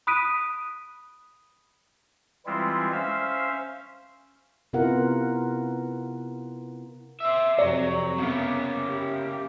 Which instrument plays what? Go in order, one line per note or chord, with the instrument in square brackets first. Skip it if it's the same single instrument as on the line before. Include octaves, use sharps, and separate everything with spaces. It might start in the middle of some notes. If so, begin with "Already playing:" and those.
[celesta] B5 D#6 F#6 B6 D7 D#7
[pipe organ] E3 G3 G#3 C4 E4 F4
C#4 C5 E5 F5
[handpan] C3 B3 E4 F4 A#4 F#5
[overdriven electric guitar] C5 E5
[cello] F2 C3 [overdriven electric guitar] F#3 [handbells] D5
[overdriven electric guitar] C#3 A#3 [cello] B3
[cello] G4